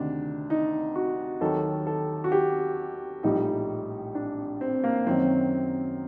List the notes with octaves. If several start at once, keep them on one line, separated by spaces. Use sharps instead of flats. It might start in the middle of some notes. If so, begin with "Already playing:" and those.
Already playing: D2 C3 D#3 D4
D#4
F#4
D#2 D#3 F#3 A4
A4
F#4
G4
A#1 A2 G3 D#4
D4
C4
A#3
F#2 D#3 F#3 C4